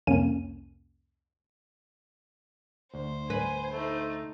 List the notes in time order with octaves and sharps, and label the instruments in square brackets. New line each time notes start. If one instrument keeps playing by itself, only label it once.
[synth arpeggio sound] C2 F2 A#3 C#4 D#7
[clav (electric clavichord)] D2 [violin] C5
[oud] B4 [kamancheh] G#5
[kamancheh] A3 D#4